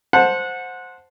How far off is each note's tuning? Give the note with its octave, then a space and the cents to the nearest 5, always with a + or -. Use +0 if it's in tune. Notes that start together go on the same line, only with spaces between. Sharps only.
C5 +0 F#5 -20 A5 +0